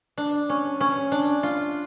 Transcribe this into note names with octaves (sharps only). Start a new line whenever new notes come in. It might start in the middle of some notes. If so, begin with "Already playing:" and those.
D4
C#4
C#4
D4
F4